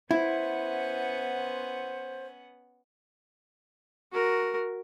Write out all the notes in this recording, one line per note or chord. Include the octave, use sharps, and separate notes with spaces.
B3 C#4 E4 C5 F#5
F#4 A#4